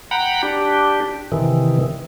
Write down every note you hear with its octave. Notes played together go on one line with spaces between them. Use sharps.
F#5 G5 A#5 B5
D4 G4
C3 D#3 E3